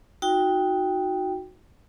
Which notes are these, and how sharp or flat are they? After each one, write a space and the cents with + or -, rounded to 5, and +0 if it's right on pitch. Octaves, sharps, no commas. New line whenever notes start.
D#4 +25 F#4 -10 G5 +5